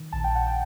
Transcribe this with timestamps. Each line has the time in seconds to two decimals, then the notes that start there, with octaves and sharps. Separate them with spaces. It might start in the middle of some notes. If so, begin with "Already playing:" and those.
Already playing: D#3
0.13 A#1 A5
0.24 G5
0.35 A#1 F#5
0.47 G5